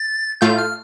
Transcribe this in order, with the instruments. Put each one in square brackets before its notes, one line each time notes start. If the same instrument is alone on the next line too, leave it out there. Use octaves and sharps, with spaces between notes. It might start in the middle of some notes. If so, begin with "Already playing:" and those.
Already playing: [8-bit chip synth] A6
[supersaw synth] A2 A3 F4 [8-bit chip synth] G6
[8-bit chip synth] F6